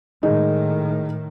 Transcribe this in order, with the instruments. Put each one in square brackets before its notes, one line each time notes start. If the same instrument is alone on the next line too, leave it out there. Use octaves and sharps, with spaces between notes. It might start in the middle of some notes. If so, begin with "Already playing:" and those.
[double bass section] A2 D#3 [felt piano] G#3 D#4